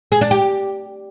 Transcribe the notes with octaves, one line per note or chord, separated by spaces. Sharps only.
G#4
D4
G4